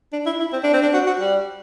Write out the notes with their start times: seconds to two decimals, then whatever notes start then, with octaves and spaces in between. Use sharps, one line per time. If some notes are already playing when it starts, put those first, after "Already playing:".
0.13 D4
0.26 E4
0.40 E4
0.53 C4
0.63 D4
0.73 C4
0.82 D4
0.93 F#4
1.06 F#4
1.19 G3